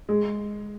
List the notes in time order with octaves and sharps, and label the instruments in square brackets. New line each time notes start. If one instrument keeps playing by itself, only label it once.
[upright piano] G#3